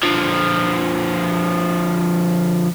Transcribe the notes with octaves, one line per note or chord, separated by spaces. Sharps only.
D3 F3